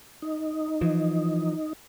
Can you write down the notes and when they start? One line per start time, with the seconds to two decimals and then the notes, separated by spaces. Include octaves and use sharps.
0.22 D#4
0.81 E3 F3